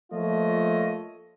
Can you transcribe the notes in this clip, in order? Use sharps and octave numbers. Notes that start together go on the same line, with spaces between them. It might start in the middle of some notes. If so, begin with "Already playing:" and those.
F3 A3 A#3 F4 C#5 D#5